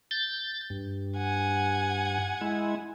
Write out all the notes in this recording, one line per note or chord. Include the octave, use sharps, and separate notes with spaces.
G6 A6
G2
F#5 G#5
G#3 E4